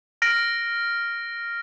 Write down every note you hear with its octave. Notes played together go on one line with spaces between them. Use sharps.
F6 A#6 D7